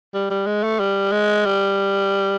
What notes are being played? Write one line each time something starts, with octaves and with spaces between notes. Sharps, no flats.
G3
G3
G#3
A3
G3
G#3
G3